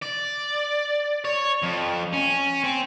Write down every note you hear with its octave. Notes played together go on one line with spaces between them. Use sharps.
D5
C#5
F2
C#4
C4